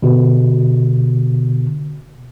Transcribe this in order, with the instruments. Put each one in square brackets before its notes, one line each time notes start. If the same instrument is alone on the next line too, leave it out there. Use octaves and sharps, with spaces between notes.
[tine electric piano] B2 D3